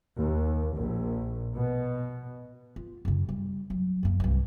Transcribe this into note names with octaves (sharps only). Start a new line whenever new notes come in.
D#2
A#1
B2
F4
F#2 C#3
G3
F#3
F#2 A#3
C2 G2